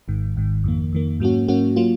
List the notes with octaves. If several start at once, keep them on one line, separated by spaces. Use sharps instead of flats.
G#1 G#2 D#3
G#1 G#2 D#3
F2 D#3 A#3
F2 D#3 A#3
G#2 F#3 A#3 C#4 F#4
G#2 F#3 A#3 C#4 F#4
F#3 A#3 F4